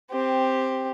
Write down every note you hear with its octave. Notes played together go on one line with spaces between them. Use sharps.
C4 G4